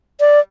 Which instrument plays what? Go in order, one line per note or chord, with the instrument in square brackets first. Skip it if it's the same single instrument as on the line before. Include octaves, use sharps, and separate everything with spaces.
[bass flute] D5